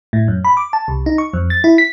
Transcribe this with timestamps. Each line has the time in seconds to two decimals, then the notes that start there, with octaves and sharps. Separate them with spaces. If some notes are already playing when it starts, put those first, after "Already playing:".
0.13 A2
0.28 F#2
0.45 B5
0.57 D6
0.73 A5
0.88 C2
1.06 D#4
1.18 C#6
1.33 F2
1.50 A6
1.64 E4
1.78 B6